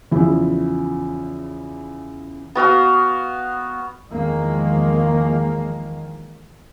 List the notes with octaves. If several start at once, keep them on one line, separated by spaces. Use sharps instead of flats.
E2 C#3 F3 E4
B3 F#4 F5 D#6
E2 D#3 F3 G#3 A#3